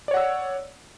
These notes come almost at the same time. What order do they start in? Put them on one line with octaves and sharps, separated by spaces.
D5 C#5 F#5 E6